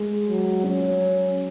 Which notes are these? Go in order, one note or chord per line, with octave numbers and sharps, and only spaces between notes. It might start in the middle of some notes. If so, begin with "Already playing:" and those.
Already playing: G#3
F#3
F#3 C#4